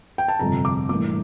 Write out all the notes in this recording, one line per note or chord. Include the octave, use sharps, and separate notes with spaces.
G5
A5
G1 F2 C3 A#5
D6
A1 G2 E3 A#3 D6